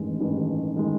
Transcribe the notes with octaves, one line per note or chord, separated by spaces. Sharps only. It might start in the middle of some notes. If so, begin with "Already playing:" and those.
Already playing: A1 G2 D#3 G#3
A1 G2 D#3 G#3
D#3 G#3